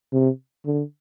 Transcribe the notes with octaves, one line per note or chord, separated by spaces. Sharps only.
C3
D3